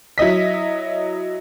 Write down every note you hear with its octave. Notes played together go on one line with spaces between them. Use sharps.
F#3 E4 D#5 B6